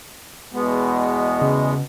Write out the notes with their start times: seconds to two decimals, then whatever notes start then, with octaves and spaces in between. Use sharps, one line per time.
0.53 E2 B2 G#3 B3
1.42 C#3